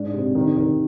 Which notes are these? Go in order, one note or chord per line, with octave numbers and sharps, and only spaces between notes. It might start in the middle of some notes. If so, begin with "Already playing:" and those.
Already playing: G#2 D4
C3
D#3
D#3